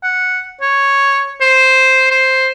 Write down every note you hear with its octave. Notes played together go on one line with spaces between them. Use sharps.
F#5
C#5
C5
C5